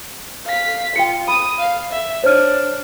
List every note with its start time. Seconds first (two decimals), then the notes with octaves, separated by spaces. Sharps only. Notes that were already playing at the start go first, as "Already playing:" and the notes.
0.46 F5 B6
0.96 F4 G5 C#7
1.28 B5 D#6
1.59 F5
1.92 E5
2.24 D4 C5 C#5 F6